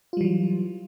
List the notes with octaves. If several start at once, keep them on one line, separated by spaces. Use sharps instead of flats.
E3 F#3 G3 F4